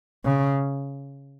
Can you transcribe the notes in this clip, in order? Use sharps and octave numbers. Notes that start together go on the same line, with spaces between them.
C#3